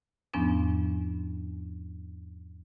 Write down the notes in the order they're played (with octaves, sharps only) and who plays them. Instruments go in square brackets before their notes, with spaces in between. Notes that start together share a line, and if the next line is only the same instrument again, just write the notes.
[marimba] E2 G#2 F3 B3 C#4 D4